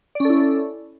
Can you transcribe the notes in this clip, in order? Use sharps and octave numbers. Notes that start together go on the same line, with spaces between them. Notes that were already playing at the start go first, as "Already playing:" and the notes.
C#4 E4 A4 D5